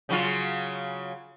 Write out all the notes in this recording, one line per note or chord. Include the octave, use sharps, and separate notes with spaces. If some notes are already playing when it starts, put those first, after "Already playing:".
C#3 F#3 F4